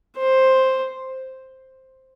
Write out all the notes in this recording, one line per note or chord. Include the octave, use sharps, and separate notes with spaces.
C5